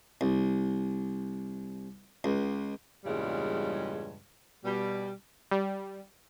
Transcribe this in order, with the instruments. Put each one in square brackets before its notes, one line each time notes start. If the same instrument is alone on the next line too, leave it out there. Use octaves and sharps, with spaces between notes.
[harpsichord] C2
C#2
[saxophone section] E2 G2 A#2 C#3 G3 G#3
B2 G3
[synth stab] G3